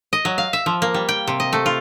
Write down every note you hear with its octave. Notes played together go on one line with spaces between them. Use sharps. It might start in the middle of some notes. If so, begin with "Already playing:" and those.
D#5
F#3
F5
E5
F3
A#3
G3
G5
C3
D#5
A3
F4